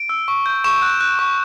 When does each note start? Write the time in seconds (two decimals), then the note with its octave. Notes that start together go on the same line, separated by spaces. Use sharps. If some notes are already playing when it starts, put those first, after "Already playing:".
Already playing: D7
0.09 E6
0.28 C#6
0.46 G6
0.64 C#6 E7
0.82 F#6
1.00 F#6
1.19 C#6